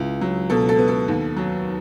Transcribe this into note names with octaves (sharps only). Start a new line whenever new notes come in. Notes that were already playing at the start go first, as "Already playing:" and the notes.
Already playing: C#2 E4
F#3
B2 A4
A4
B3
A4
D#2
F#3